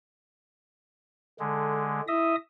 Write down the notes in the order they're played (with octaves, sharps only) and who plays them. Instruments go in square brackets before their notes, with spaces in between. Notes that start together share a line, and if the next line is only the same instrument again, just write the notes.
[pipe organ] D3 G#3 [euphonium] A4
[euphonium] E4 [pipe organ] D#5 E5 D#6